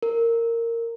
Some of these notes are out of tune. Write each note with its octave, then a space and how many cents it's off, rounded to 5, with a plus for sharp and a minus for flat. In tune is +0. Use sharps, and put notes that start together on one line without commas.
A#4 -15